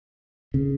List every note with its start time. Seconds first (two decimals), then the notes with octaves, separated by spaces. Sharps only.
0.54 C#3